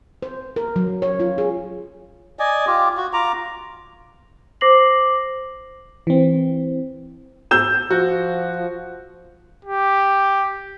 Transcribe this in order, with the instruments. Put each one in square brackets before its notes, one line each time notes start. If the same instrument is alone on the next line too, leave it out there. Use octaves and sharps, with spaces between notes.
[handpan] C5
A#4
F#3
C#5
F4
G#4
[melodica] D5 D#5 G#5
F4 G4
F#4
F4 A#5 D6
[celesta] C5 D6 A#6 C7 F#7
[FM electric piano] E3 C4
[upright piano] E6 G6 E7
[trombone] F3 [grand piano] F#4
[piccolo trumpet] G4